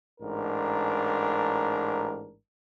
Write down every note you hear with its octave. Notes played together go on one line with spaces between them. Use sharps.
A1 G#2 D4 A#4